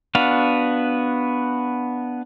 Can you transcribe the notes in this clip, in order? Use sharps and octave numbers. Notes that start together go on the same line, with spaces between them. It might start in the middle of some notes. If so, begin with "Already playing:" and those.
B3 D4 F#4 F5